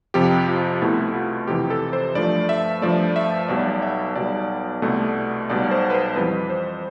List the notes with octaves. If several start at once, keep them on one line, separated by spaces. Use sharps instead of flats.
F2 C3 F3 G4
F4
C2 B2 A3 E4
F4
F2 C3 E3 G4
A4
C5
G2 F3 A3 D5
E5
G2 F3 A3 D5
E5
B1 B2 G3 D5
E5
B1 B2 G3 D5
C2 B2 A3
B1 B2 G3 D5
C5
B4
C5
F2 E3 G3 B4
C5